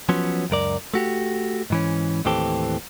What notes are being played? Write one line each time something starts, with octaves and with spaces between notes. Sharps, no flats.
F3 F#3 B3 C#4
C#2 F#2 A#4 D5
A3 F#4 G4
G#2 E3 C#4
D#2 A2 E3 C4 G4 A4